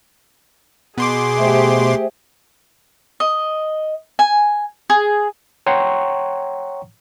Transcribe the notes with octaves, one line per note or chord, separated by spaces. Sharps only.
B2 G#4 C6 D6
A3 G4 C5 E5
D#5
G#5
G#4
C#5 F#5 G5 A#5 C6 C#6